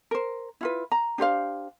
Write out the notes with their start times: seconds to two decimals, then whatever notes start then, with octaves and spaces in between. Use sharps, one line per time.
0.11 A#4 C5
0.61 E4 F4 B4
0.92 A#5
1.18 D4 G4 C5 F5